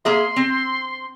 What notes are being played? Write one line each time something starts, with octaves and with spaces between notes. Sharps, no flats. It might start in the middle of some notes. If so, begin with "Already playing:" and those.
A#3 G#4 E5 C6
C4